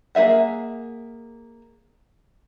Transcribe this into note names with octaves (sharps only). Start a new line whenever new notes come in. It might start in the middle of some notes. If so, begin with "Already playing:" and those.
A#3 G#4 E5 F#5